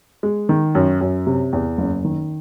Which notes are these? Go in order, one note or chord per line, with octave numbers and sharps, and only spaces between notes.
G#3
D#3
F#2
F#2
C3
E2
F#1
D#3